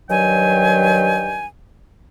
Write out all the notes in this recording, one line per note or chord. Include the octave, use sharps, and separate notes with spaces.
G2 D#3 F#3 G5 G#5